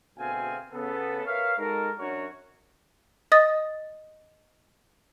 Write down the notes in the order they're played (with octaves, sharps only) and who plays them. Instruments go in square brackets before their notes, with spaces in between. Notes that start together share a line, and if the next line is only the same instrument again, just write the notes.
[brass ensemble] D2 B2 C4 G#4 F5 G#5
C#3 B3 A4
A#4 B4 C#5 E5 F5
G#3 D#4 F#4 A4 A#4
F#2 D4 F#4 A#4 C#5
[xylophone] D#5 D#6 A6